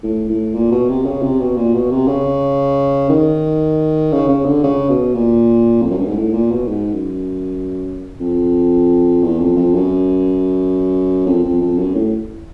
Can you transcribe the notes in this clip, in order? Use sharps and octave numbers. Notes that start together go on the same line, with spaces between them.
A2
A2
A#2
B2
C3
C#3
C3
B2
A#2
B2
C3
C#3
D#3
C#3
C#3
D3
C#3
B2
A#2
F2
F#2
G2
G#2
A2
A#2
B2
G#2
F#2
F2
E2
F2
F2
F#2
F2
F2
F2
F#2
A2